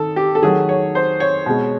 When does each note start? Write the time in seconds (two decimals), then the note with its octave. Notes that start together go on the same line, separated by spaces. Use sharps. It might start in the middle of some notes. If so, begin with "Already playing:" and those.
Already playing: D#3 A4
0.16 G4
0.35 A4
0.43 D#3 F#3 A3 G#4
0.69 C#5
0.95 C5
1.20 C#5
1.46 B2 G#3